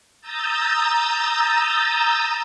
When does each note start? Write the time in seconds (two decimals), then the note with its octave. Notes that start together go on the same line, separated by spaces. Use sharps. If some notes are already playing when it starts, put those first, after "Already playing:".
0.21 A#5 D#6 E6 G6 A6